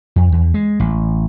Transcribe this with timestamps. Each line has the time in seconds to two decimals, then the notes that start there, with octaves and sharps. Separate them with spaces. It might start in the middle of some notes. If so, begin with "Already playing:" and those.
0.16 F2
0.32 E2
0.54 G#3
0.80 A1